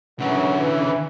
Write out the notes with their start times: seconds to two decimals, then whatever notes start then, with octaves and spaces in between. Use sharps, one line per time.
0.20 F#2 D3 E3 F#3 C#4
0.59 E3